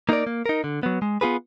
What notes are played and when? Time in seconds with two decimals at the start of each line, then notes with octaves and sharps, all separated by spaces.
0.09 A#3 D#4 A#4 D5
0.27 A#3
0.46 D#4 A#4
0.64 D3
0.83 F#3 B3
1.02 G#3
1.21 B3 F4 G#4 B4